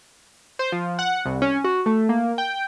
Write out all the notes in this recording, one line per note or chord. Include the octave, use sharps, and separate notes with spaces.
C5
F3
F#5
C2
C#4
F#4
A3
A#3
G5